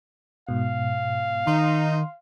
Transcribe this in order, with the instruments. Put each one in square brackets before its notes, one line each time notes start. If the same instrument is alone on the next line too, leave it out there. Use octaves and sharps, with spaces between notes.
[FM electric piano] G#2 B2 [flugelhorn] F5
[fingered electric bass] D#3 [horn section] D#4 [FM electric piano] C6